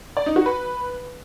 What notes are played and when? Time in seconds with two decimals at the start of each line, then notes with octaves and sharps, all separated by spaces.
0.17 D5
0.26 D#4
0.36 F#4
0.46 B4